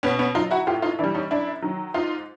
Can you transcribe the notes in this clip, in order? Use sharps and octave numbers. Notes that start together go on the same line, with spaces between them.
B2 B3 C#4
B3 C#4
F#3 D#4 F4
E4 F#4
A2 F4 G4
D#4 F4
E3 G3 D4 E4
C#4 D#4
F#2 D4 E4
D#3 F#3
G#2 D#4 F4